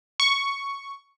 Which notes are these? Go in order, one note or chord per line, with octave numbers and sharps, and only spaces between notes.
C#6